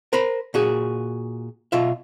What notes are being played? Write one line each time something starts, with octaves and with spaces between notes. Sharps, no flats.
A#4 C5 A#5 B5
A#2 F#4 G#4
B2 F4 E5